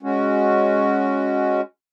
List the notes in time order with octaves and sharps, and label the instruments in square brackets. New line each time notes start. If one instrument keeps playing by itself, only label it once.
[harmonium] G#3 C#4 F#4